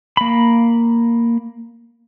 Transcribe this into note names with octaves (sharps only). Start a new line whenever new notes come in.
A#3 B5